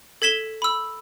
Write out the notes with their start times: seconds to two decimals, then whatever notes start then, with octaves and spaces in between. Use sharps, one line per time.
0.22 A4 G#6 B6 E7 G7
0.62 B5 E6